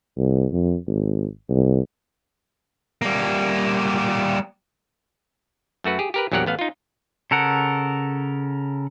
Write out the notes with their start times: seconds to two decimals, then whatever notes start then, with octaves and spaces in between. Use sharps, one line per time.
0.17 C2
0.52 F2
0.87 G#1
1.49 C2
3.02 G3 A#3
5.84 F#2 A3 F#4 B4
5.99 G4 G#4
6.14 G4 A#4 B4
6.32 A#1 E2 F#3 G4 A#4 F#5
6.46 A1 B3 F5
6.59 D#4 F4
7.31 C#3 A4 A#4 F#5